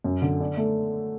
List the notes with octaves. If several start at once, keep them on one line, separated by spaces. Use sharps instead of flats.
F#2
D3
D4
A3